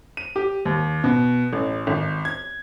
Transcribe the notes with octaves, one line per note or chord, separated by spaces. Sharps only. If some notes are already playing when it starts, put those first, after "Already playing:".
D#7
G4
D#2
B2
A1
G#1
G#6